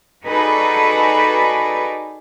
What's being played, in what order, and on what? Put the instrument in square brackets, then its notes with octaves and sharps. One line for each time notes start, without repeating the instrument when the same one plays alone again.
[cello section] D#4 F#4 G#4 A4 B4 D5